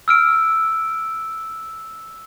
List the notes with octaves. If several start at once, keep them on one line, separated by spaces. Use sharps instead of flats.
E6 F6 D7